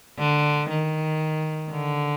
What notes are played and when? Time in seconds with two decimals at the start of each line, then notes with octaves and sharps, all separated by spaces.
0.18 D3
0.69 D#3
1.71 D3